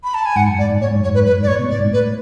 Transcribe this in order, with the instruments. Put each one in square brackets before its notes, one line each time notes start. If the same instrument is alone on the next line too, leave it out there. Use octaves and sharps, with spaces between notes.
[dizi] B5
A5
G#5
[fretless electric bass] G#2 [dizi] F#5
[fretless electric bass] F#2
[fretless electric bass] G#2 [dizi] D5
[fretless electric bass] G#2
[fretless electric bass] A2 [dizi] C#5
[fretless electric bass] G#2
[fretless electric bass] F#2 [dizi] C#5
[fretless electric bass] G#2
[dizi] B4
[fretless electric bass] F#2 [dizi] B4
[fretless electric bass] G#2
[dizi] D5
[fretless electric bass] A2 [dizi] C#5
[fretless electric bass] B2
[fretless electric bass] A2 [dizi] D5
[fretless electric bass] G#2
[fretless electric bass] A2 [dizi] B4